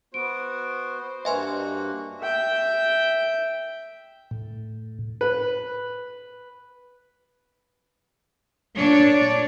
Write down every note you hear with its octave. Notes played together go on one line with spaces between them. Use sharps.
B3 F#4 C5 D7
G2 A#3 F#4 B4 D#5 E5 G#5 C6
E5 G5
A2
B4
A#2 D4 C#5 D5